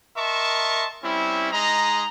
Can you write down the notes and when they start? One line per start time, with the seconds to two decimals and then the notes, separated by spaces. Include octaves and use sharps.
0.16 A#4 D#5 E5 A5 C6 C#6
1.03 G3 C4 C#4 E4
1.52 G#3 D#4 D#5 A#5